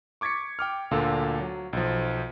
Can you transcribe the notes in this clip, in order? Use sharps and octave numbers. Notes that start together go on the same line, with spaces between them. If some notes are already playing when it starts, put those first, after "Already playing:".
C#6 D6 G#6 A6 B6 C#7
G5 D6 F6
D2 A#2 D3 F4 A4 F5
F#3
B1 F3